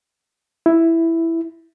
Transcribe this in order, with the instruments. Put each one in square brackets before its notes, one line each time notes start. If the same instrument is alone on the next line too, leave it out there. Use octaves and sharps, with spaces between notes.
[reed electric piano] E4